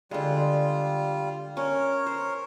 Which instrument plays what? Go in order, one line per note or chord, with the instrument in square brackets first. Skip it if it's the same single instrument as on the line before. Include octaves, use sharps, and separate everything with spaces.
[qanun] D3 G#3 [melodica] G3 F4
[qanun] C#4 [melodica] A#4 C#5
[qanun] C5